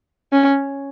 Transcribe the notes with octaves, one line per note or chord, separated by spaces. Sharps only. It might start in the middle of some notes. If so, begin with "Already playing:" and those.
C#4